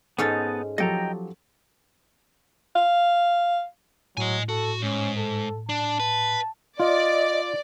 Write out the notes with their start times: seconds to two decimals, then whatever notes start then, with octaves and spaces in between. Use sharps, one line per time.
0.18 G#2 B3 C#4 D#4 A4 A5
0.78 F3 F#3 G4 A4 D#5 G5 A#5
2.76 F5
4.17 A2 F#3 D#5 G#5
4.49 F#4 A4
4.83 G#2 C#4
5.17 A4
5.69 D4 A5
6.00 B4
6.80 F4 D5 D#5